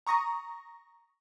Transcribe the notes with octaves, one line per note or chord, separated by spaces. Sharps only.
A#5 C#6 D#6 A#6